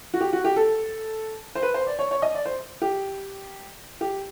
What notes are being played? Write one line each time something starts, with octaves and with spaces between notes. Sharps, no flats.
F#4
G4
F#4
G4
A4
C5
B4
C5
D5
C#5
C#5
D#5
D5
C5
G4
G4